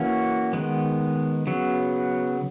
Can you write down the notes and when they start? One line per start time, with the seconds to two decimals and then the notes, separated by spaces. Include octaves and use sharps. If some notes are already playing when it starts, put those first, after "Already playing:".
Already playing: E3 A#3 C#4 F#4
0.53 D#3 G#3 B3
1.47 C#3 F#3 B3